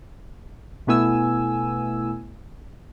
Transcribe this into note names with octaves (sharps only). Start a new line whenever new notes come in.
B2 A3 B3 E4 G#5 E6